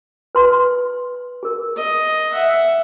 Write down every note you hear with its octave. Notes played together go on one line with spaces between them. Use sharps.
B4 C6
G#4 A#4
D#5
E5 F#5